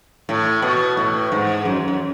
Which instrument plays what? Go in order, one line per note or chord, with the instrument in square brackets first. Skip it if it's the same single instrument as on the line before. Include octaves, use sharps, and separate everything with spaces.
[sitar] A2
B2
A2
G#2
F#2
F#2